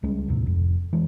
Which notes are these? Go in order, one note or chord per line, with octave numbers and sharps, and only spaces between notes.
C#2 G3 G#3 C#4
D#2 A2 C3
F1 F2
E3 G#3